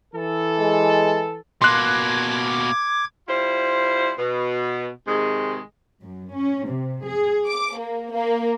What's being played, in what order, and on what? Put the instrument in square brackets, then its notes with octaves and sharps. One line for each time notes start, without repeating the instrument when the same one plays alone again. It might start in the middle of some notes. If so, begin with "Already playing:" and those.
[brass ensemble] E3 A4
[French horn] G#3
[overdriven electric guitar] B2 A#3 [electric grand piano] C6 F#6 [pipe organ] D6 G#6
[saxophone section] G3 E4 F4 C5
B2
G#2 C3 D#3 G#3
[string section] F#2
C#4
C3
G#4
D6
A#3
A#3